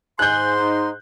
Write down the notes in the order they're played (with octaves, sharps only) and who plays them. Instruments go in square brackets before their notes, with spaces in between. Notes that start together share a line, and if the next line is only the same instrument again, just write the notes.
[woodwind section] G#2 C6 [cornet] G#5 [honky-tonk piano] F#6 G6
[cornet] D#4